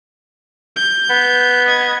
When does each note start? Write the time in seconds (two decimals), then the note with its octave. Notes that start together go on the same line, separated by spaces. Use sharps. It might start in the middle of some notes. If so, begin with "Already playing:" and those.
0.76 G6
1.10 B3
1.66 D#5 G#6